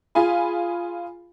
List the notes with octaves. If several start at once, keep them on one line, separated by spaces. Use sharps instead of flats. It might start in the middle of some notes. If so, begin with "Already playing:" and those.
F4 G#4 F5 G#5 B5